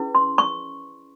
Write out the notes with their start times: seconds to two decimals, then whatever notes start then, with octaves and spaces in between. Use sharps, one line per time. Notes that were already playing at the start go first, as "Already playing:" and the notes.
Already playing: C#4 E4 G#4 B4
0.15 C6
0.38 C#6